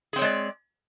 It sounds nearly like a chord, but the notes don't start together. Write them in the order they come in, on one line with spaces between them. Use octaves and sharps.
G#4 C4 C#5 G#3 D5